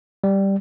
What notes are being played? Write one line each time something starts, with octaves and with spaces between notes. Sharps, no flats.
G3